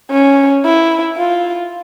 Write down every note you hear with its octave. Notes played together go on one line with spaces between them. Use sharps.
C#4
E4
F4